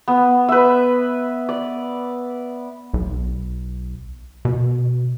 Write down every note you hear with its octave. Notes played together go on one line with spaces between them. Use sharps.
B3
B4 E5
D5
B1
B2